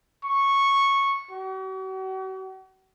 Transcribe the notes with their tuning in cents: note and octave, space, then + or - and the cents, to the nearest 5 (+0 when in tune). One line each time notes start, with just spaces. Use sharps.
C#6 -10
F#4 +45